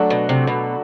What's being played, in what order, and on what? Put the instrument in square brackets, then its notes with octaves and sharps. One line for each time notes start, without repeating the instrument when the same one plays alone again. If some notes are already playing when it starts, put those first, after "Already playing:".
Already playing: [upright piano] F#3 A3 D4 F#4
[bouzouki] B2
C3
B2